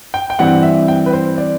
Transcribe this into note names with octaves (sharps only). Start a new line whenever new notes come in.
G5
G5
G2 E3 G3 C4 F#5
E5
G5
B4
C5
D5